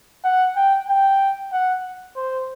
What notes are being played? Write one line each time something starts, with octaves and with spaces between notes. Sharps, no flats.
F#5
G5
G5
F#5
C5